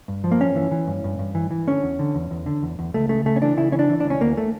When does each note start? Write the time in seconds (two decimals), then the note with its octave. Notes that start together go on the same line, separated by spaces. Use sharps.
0.08 G2
0.24 F3
0.32 A#3
0.40 G2 C#4
0.56 E3
0.71 E3
0.87 G2
1.04 G2
1.19 G2
1.35 E3
1.51 E3
1.67 D3 C#4
1.82 E2
1.99 D3
2.15 E2
2.31 E2
2.46 D3
2.63 E2
2.79 E2
2.94 C#2 A3
3.09 C#3 A3
3.25 C#3 A3
3.36 C#4
3.42 E3 D4
3.57 C#3 E4
3.72 E3 C#4
3.79 D4
3.89 E3
4.00 C#2 D4
4.10 C#4
4.20 D2 A#3
4.37 A3